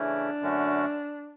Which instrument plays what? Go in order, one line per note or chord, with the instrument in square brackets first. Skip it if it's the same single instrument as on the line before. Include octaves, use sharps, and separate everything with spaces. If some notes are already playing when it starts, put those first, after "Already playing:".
Already playing: [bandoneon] C#3 E3 A3 C#4 E4 [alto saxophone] D4
[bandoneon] F#2 D3 A3 C#4 F#4